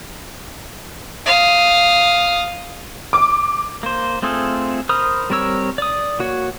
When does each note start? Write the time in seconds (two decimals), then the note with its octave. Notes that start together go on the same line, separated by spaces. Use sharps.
1.26 F5 D#6
3.13 D6
3.83 A#3 C5
4.22 A3 C4 F4 G#4 A4
4.89 A#4 C5 B5 D#6 F6
5.30 G3 C4 A#4 C#5 E6
5.78 D5 D#6
6.19 A#3 F#4 C#5